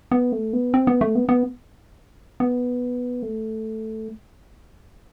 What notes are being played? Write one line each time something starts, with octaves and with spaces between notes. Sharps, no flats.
B3
A3
B3
C4
B3
A3
B3
B3
B3
A3